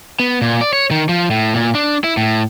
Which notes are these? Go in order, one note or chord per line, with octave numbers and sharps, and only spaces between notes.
B3
A#2
D5
C#5
D#3
F3
A2
A#2
D4
E4
A2